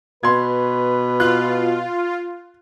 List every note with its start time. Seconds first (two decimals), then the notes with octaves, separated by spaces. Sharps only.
0.23 B2 B4 C6 G#6
1.20 F4 F#6